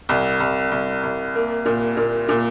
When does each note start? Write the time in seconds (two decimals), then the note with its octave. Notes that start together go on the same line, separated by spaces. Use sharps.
0.09 C2
0.40 C2
0.72 C2
1.03 C2
1.35 A#3
1.65 A#2
1.97 A#2
2.29 A#2